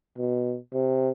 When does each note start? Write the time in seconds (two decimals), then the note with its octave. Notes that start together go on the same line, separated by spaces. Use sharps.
0.18 B2
0.73 C3